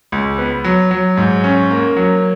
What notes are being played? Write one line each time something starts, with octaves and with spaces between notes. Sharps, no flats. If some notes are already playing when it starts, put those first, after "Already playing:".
C#2
B3
F#3
F#3
G#2
C#4
A#3
F#3